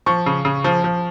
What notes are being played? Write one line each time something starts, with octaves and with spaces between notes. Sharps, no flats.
F3 C#6
C#3
C#3
F3
F3